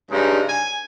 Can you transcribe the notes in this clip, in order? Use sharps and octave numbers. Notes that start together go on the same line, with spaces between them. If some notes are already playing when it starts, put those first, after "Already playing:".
G2 C#3 G#3 D#4
G#5